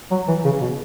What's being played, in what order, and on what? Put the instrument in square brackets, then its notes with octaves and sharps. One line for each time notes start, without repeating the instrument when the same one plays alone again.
[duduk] F#3
E3
C#3
B2